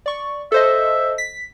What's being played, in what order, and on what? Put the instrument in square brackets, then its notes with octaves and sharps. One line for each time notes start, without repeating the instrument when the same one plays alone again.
[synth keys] D5 C#6
[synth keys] A4 C5 D#5 [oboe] E5
[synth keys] B6